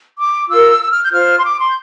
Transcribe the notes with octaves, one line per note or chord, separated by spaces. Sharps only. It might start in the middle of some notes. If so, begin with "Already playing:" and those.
D6
F4 A#4 E6
E6
F6
G6
F4 C5 F6
C6
D6
C6
G6